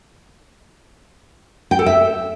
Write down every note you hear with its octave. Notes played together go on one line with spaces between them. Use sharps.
G5
A4
E5